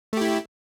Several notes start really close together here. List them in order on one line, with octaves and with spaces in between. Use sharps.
A3 G4 E4